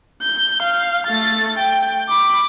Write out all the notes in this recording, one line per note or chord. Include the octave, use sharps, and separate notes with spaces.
G6
F5
A3 A6
G5
B5 D6